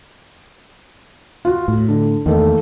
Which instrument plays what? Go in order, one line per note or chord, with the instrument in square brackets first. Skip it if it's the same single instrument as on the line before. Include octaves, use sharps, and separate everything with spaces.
[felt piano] F4 F#4
[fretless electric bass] A2
[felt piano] D3
[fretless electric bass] E2 [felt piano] D#3 A3 A#3